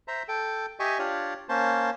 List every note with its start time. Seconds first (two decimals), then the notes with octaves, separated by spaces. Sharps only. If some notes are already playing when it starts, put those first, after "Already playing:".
0.08 C5 E5 A#5
0.28 A4 G5
0.80 G4 D#5 E5 G#5 C#6
0.99 D4 F4 G4 C#5 D5
1.49 A#3 C#4 C5 A5